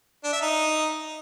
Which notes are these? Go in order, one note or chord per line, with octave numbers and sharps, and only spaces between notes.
D4
E5
D#4